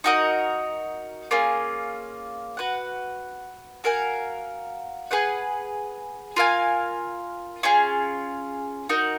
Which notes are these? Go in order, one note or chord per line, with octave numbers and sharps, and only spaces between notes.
D#4 F#4 A#4 D#5
A#3 C#4 F4 G#4
F#4 B4 F#5
F#4 A#4 F5 G#5
G#4 B4 F#5
F4 A#4 F5 G#5
C#4 F4 G#4
D#4 F#4 A#4